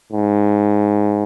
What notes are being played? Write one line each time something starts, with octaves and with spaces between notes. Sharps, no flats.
G#2